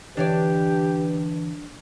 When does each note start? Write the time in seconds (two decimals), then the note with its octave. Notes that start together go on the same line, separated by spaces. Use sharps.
0.17 D3 E3 D4 G4 B4 C#5 D5